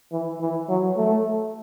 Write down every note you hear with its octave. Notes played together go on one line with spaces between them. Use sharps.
E3
E3
F#3
A3